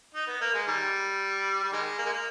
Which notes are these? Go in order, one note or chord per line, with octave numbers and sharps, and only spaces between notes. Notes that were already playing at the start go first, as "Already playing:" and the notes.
D#4
B3
A#3
G#3
D#3 G3
G3
D#3 G#3
A#3
G#3
A#3